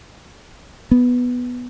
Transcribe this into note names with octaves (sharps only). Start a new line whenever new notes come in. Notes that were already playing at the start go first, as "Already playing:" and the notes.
B3